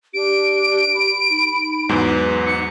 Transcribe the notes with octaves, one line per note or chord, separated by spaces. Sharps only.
D4 G4 D7
B5
D#4
E2 G#2 F#3 B4
C#7